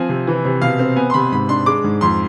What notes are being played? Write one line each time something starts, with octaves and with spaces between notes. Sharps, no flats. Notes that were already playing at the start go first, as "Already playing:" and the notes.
Already playing: F3 C4 G#5
C3
E3
C3
B2 F5
C4
B3 G#5
C6
C3 B5
G#2 B5
D4 C6
G#3 D6
G#2
F2 C6